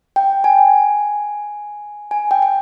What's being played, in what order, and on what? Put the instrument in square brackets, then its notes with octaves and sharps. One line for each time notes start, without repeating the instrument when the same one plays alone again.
[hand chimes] G5
G#5
G#5
G5
G5